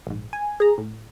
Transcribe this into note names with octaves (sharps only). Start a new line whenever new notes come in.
A#1 G#2
G#5
G#4 A#5
A2